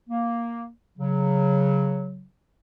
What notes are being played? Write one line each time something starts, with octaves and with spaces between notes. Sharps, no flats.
A#3
C#3 F#3